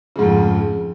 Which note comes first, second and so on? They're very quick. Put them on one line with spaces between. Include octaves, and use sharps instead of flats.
C#3 G#2 F2